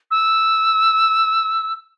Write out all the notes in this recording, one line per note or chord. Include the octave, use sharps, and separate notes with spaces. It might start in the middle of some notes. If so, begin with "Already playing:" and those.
E6